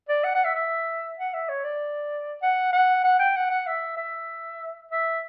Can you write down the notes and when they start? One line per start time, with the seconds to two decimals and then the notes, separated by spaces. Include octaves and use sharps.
0.09 D5
0.24 F#5
0.35 F#5
0.45 E5
0.55 E5
1.18 F#5
1.33 E5
1.49 C#5
1.64 D5
2.42 F#5
2.73 F#5
3.04 F#5
3.19 G5
3.36 F#5
3.50 F#5
3.67 E5
3.97 E5
4.91 E5